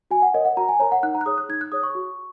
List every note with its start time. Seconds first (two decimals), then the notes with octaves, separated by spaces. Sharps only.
0.11 F#4 G#5
0.22 F#5
0.34 A#4 C#5 D#5
0.45 F#5
0.57 F#4 A#5
0.69 G#5
0.80 A#4 C#5 A#5
0.92 F#5
1.03 D#4 F#6
1.15 A#5
1.21 F#6
1.26 G#4 C#5 D#6
1.38 F#6
1.49 D#4 G#6
1.61 F#6
1.72 G#4 C#5 D#6
1.83 C#6
1.95 F#4